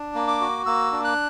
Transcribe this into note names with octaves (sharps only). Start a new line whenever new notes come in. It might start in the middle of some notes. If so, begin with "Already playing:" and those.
Already playing: D4
A#3
D6
F#4
A#3 E6
D4
F#6